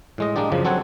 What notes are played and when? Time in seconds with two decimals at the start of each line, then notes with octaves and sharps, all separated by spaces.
0.18 A2 G#3 D#5
0.36 G#3 A#3 D4 G4 D5
0.52 F#2 C#3 F3
0.65 F#3 C4 A4 F#5 G#5